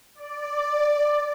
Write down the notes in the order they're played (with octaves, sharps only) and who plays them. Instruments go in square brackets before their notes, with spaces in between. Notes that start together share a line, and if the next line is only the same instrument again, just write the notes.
[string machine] D5